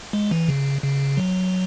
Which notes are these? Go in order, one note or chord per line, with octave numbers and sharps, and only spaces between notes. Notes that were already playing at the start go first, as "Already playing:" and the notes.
G#3
E3
C#3
C#3
F#3